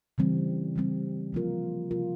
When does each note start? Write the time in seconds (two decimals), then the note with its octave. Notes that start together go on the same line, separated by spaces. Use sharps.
0.18 C#3 E3 G3 C4
0.76 C#3 E3 G3 C4
1.33 C3 F3 A#3 F4 A#4
1.91 C3 F3 A#3 F4 A#4